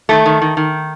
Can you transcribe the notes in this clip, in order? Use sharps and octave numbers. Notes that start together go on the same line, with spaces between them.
D#3 A3
D#3
D#3
D#3